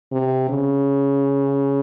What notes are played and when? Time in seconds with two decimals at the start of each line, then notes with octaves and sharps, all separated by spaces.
0.12 C3
0.49 C#3